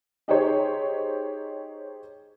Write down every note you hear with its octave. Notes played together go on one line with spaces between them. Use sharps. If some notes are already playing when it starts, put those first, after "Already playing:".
D#4 G4 G#4 C5 C#5